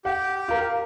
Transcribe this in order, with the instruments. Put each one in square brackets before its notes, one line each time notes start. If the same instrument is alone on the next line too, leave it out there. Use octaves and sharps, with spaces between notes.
[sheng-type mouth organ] G4 [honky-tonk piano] F#5
[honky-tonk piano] F4 A#4